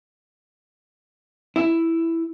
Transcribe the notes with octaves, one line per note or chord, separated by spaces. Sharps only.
E4